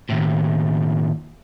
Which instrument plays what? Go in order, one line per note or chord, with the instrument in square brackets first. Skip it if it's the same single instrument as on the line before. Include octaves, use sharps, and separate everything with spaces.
[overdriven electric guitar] D#2 A2